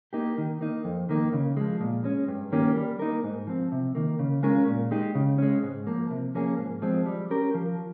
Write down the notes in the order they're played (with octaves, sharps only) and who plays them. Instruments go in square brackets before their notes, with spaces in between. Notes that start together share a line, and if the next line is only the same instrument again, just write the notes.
[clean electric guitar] A#3 D#4 G4
D#3
A#3 D#4
F2
D#3 A#3 D#4
C#3
F3 G#3
A#2
G#3 C#4
G2
D#3 A#3 C#4 G4
G3
A#3 D#4 A#4
G#2
F3 C4
C3
D#3 A#3
C#3
G#3 C#4 F4 A#4
A#2
G#3 D#4 G4
C#3
G#3 C#4
G#2
F3 A#3
C3
F3 A#3 C#4 G#4
G#2
F3 G#3 C4
G3
C#4 G4 A#4
F3